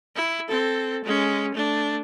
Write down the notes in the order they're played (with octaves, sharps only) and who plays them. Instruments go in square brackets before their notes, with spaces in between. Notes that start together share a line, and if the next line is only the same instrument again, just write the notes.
[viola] E4
C4 A4
G#3 C#4
A3 D4